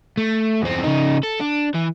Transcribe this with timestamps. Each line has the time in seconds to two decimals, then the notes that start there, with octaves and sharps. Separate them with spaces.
0.17 A3
0.62 E2 C4
0.84 C#3 D#4
1.23 A4
1.40 D4
1.74 E3